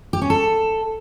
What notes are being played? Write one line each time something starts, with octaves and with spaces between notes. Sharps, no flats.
G4
C#4
A4